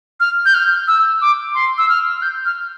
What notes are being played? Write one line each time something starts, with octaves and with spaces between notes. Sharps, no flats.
F6
G6
F6
E6
D6
C6
E6
F6
F6
G6
F6